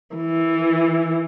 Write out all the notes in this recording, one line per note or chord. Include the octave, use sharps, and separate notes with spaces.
E3